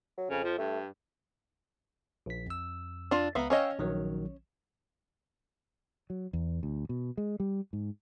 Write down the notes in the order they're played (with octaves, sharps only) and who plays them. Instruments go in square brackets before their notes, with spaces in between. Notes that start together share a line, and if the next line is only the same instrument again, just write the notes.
[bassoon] F#3
[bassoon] F2 [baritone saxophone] C#3
[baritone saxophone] F3
[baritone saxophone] G2 [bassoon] A3
[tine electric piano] A#1 B6
F2 E6
[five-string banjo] D4 F4
[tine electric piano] C#2 A#5 [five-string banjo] B3 E5 F5
[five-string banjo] C#4 C#5 D#5 [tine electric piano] F5 G5 E6
[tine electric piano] A#1 D#3 F#3
[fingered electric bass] F#3
E2
D2
B2
G#3
G3
G#2